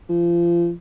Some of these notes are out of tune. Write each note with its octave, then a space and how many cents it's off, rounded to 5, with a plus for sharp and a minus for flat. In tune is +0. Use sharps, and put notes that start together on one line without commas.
F3 -30